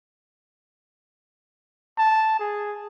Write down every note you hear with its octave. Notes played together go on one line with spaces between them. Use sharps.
A5
G#4